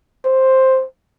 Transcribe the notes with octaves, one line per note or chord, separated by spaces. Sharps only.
C5